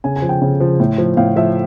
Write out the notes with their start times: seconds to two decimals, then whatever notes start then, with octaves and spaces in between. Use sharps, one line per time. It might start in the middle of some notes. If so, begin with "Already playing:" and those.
0.04 C#3 G#5
0.16 G#5
0.22 F3
0.29 G5
0.42 C#3
0.60 F3
0.80 A2
0.98 F3
1.17 A2 F5
1.36 F3 E5